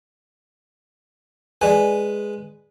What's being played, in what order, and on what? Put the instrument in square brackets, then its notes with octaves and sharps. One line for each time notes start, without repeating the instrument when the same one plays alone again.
[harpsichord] G#3 B4 [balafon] D5 G#5